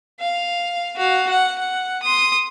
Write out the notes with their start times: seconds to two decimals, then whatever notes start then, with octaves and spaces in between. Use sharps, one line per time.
0.20 F5
0.97 F#4 F5
1.29 F#5
1.59 F#5
2.03 C6 D#6